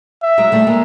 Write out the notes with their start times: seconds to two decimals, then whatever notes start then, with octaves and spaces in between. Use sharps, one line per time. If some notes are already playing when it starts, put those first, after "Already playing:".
0.23 E5
0.38 F#3 G#3
0.52 G3 A3
0.67 G#3 A#3